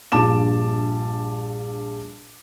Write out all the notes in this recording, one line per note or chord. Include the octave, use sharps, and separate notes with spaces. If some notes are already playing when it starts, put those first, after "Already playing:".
A#1 G2 F4 A5 D6 E7